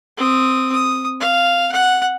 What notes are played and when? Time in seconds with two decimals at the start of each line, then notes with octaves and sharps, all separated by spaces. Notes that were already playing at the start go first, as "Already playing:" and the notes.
0.18 C4 D#6
0.72 D#6
1.20 F5
1.72 F#5